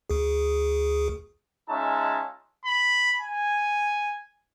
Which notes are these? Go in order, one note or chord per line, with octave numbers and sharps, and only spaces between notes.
D2 G#4
G#3 C#4 D#4 F4 E5 A5
B5
G#5